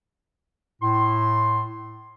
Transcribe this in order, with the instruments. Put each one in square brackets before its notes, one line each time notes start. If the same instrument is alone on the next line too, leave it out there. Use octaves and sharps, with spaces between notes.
[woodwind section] A2 C6